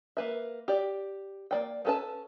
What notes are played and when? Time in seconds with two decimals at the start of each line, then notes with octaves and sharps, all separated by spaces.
0.17 A#3 B4 E5
0.68 G4 D5
1.51 A#3 D5 G5
1.85 B3 C#4 A4 B4 A5